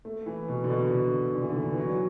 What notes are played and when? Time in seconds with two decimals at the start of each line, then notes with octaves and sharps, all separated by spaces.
0.05 A3
0.26 E3
0.48 B2
0.64 D3
0.70 B2
0.91 D3
1.35 D3
1.42 E3
1.49 D3
1.56 E3
1.63 D3
1.73 E3
1.78 F#3